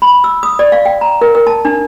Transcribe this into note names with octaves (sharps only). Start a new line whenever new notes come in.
B5
E6
D#6
D5
F5
G5
A#5
A#4
A#4
A5
D4